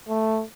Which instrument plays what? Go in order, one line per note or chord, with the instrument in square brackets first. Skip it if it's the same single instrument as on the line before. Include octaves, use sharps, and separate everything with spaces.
[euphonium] A3